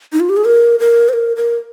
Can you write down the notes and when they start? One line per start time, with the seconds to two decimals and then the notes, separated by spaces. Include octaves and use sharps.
0.13 D#4
0.20 F4
0.29 G4
0.37 G#4
0.45 A#4
0.80 A#4
1.09 C5
1.13 A#4
1.36 A#4